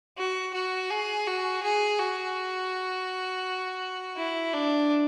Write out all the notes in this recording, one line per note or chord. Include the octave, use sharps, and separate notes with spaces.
F#4
F#4
G#4
F#4
G#4
F#4
E4
D4